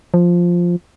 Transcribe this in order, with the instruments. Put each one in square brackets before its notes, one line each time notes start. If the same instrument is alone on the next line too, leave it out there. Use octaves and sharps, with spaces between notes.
[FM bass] F3